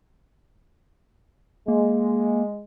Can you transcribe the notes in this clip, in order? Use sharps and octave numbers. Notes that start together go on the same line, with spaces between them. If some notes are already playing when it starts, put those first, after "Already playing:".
G#3 A#3